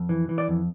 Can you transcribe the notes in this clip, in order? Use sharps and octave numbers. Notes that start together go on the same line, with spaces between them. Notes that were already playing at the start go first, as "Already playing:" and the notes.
Already playing: F2
E3
E3
D5
F2